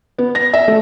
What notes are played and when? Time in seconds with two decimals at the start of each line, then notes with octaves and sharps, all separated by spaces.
0.19 B3
0.35 A#6
0.54 E5
0.68 A3